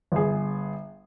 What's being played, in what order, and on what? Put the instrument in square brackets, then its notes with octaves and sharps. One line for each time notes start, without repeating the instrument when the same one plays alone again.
[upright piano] G1 G#4